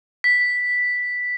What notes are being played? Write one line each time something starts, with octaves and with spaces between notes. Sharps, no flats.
B6